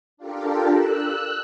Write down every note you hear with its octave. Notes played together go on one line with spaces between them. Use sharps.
D4 F4 G4 A4 A#4
E6 F#6